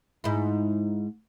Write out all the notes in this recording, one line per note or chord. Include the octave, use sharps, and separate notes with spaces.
G#2 E4